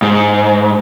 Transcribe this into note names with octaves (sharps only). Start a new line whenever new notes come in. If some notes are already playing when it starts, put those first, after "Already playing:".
G#2